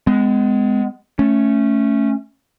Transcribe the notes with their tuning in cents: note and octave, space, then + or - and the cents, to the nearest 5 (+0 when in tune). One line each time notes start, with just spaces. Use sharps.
G#3 +0 B3 +40
A3 +0 C#4 +0